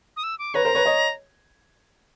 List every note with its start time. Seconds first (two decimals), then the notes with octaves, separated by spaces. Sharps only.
0.16 D#6
0.23 E6
0.39 D6
0.54 B4 C#5 A#5
0.65 A#4 C5
0.75 B4 C#5
0.85 C#5 D#5